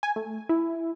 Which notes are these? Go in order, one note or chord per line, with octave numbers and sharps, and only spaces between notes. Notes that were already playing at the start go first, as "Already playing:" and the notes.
G#5
A3
E4